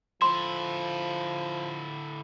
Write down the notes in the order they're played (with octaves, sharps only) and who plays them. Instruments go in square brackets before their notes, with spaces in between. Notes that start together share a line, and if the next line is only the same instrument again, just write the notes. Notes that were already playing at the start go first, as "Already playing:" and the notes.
[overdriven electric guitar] D3 E4 [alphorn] F3 [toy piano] C6